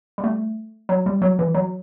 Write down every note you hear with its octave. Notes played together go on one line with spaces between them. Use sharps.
G3
A3
F#3
G3
F#3
E3
F#3